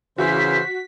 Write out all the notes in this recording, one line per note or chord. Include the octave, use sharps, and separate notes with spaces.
C#3 E3 F#4 C5 B6